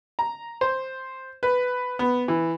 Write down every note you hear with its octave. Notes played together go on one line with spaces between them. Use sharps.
A#5
C5
B4
B3
E3